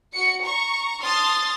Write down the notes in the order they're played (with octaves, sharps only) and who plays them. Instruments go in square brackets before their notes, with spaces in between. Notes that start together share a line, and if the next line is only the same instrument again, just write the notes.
[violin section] F#4 C#7
A#5 C#6
A5 C6 D#6 F6 A6